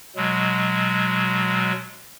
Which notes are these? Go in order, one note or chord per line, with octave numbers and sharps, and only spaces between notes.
B2 F#3 G#3